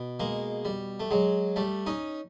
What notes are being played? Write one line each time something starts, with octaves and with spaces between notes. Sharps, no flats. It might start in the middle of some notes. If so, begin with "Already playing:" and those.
Already playing: B2
G#3 A#3
G3
A3
F#3 G#3
G3 A3
C#4 D#4